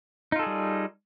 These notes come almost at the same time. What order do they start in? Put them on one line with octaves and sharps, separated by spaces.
D#4 F4 A4 G#4 G3